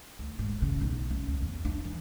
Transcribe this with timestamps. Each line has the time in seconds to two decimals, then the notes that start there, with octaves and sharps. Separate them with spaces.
0.19 D2
0.39 G#2
0.62 C#3
0.81 B1
1.10 C#4
1.28 C#2
1.41 E2
1.65 D4
1.85 E3